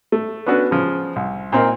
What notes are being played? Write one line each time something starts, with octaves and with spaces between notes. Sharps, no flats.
A3
B3 C#4 D4 F#4 A4 B4
C#3 F3
C2
A#2 C4 D#4 A#4